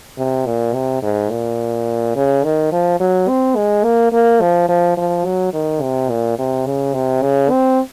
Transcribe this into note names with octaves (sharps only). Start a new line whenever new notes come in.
C3
A#2
C3
G#2
A#2
C#3
D#3
F3
F#3
C4
G#3
A#3
A#3
F3
F3
F3
F#3
D#3
C3
A#2
C3
C#3
C3
C#3
C4